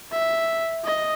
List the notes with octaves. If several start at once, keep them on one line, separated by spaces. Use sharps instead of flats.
E5
D#5